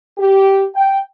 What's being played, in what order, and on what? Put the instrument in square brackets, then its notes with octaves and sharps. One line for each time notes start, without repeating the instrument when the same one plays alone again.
[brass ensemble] G4
G5